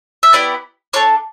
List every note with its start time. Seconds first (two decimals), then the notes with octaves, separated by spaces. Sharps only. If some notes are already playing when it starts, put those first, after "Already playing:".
0.23 E5
0.33 B3 E4 G4 D5
0.93 D4 A4 C#5